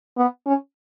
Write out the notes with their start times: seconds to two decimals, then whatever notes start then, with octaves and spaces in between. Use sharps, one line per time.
0.17 B3
0.46 C#4